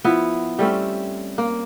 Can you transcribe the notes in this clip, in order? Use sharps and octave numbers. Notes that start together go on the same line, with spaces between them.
F3 B3 E4 B4
G3 A3 C4 C#4
A#3